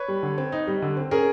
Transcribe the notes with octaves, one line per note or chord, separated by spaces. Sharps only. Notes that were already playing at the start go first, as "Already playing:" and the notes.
Already playing: B4 C#5
G3
D3
C4
D#4
G3
D3
C4
C#4 G#4 A#4